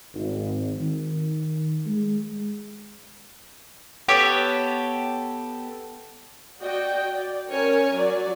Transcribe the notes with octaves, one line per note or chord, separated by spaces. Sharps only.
G#1
D#3
G#3
B3 G4 A4 C#5
F#4 D5 D#5 G5
D5
C#4 A#4 C#5 G#5
F#3 D5